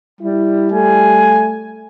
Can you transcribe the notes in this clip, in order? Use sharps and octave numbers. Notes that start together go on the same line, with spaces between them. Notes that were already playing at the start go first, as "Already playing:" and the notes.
G3 E4
A3 G#5